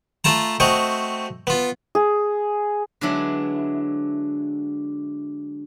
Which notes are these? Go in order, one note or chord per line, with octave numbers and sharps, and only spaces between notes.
A3 F4 A5 A#5
A3 C4 F#4 D#5
B3 F4
G#4
D3 F#3 G#3 B3 D4 E4